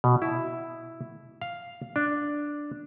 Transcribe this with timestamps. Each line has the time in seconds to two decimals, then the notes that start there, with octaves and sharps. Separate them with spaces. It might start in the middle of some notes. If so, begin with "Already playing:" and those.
0.04 B2
0.22 E4
1.41 F5
1.96 D4